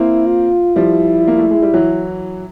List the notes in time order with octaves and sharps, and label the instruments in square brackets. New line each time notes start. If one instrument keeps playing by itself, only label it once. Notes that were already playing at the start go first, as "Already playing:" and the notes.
Already playing: [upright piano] A#3 C4 [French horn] E4
[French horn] F4
[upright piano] F3 G3 [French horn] E4
[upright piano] A#3
A3
G#3
G3
E3 F#3